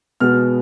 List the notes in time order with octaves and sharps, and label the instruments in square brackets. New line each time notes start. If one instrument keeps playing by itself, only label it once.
[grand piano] B2 G#3 B3 F6